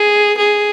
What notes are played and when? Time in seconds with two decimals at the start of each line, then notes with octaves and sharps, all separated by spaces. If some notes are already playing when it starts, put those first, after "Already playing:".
Already playing: G#4
0.38 G#4